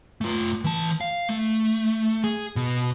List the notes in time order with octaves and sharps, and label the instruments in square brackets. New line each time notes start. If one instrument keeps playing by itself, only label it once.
[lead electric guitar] A3 F4
E3 A5
F5
A3
G#4
B2